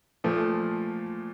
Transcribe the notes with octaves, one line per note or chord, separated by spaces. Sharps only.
A#2 F3 A3